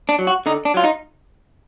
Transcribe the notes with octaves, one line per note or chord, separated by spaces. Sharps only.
D4
F#3
F#4
D3 D#4
D4
F#3 F4
D#4